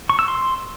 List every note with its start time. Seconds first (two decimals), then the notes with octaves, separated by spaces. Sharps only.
0.10 C#6
0.19 E6
0.28 C6